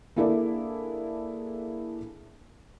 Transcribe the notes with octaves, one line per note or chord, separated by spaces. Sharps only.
A#3 D4 E4 G#4 A4 D5